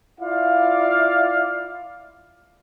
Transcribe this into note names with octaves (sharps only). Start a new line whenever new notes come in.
E4 F4 D5 F5